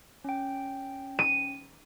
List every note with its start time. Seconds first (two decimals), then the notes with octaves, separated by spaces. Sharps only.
0.24 C#4 G5
1.19 D#7